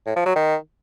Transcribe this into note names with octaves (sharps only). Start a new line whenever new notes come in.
A2
F3
F#3
D#3